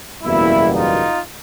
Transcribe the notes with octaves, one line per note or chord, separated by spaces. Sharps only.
F#1 E2 B2 G3 A#3 E4
D#4 F4